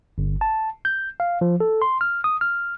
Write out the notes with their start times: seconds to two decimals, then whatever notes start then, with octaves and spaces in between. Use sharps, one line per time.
0.18 G1
0.41 A5
0.85 G6
1.20 F5
1.41 F3
1.60 A4
1.82 C6
2.01 F6
2.24 D#6
2.41 F6